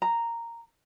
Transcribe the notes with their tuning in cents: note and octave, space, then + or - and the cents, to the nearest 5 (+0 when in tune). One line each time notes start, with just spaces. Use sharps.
A#5 -5